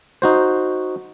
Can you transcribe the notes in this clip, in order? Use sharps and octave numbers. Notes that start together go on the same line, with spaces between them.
D#4 F#4 C5